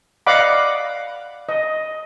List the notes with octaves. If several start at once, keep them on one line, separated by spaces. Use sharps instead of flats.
D5 D#5 F5 F#5 B5 D6
D#5